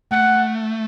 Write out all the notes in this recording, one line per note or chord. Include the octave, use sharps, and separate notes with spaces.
A3 F#5